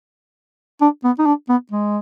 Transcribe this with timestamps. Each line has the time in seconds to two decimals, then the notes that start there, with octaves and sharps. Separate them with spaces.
0.81 D4
1.04 B3
1.19 D#4
1.26 D4
1.49 B3
1.72 G#3